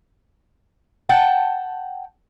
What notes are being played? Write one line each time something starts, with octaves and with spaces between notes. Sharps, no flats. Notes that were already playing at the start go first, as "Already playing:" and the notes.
F#5 G5 A5